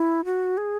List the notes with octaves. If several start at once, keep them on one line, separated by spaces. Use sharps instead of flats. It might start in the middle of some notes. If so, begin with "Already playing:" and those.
Already playing: E4
F#4
G#4